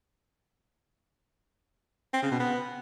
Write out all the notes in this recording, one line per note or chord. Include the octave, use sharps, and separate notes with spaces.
C4
C#3
B2
B3